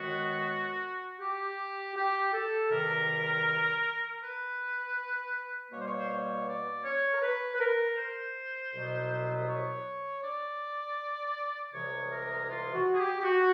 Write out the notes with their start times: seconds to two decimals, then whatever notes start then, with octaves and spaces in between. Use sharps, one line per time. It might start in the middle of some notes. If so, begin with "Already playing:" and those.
Already playing: F#2 D#3 G#3 B3 F#4
1.20 G4
1.96 G4
2.33 A4
2.70 E2 C3 D#3 G3 A#4
4.22 B4
5.72 B2 G3 A#3 C#5
5.79 C5
5.87 C#5
5.99 C5
6.10 C#5
6.47 D5
6.84 C#5
7.14 A#4
7.22 B4
7.55 B4
7.60 A#4
7.97 C5
8.72 C2 B2 F#3 B3
9.48 C#5
10.22 D5
11.73 C2 C3 E3 G#3 C#5
12.11 A#4
12.48 F4
12.74 F#4
12.94 G#4
12.98 G4
13.20 G4
13.24 F#4